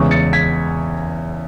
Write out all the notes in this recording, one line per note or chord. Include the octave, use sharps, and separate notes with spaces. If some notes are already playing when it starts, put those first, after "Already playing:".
Already playing: E2 C#3 G#3 C#6
A6 C#7
G#6 B6